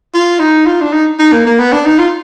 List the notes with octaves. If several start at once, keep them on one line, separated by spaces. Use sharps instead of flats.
F4
D#4
F4
D4
D#4
D#4
A#3
A#3
B3
D4
D#4
F4